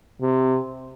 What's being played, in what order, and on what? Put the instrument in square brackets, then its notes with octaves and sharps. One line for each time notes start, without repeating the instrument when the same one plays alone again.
[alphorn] C3